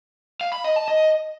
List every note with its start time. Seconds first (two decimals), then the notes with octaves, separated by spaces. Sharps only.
0.41 F5
0.53 B5
0.64 D#5
0.76 A5
0.88 D#5